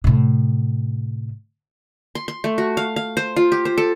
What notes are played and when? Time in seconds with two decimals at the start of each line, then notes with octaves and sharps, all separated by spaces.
0.04 A2 C3
2.15 C6
2.28 C6
2.44 A3
2.58 F#4
2.77 F5
2.96 F5
3.17 C5
3.36 F4
3.52 G4
3.65 C5
3.78 A4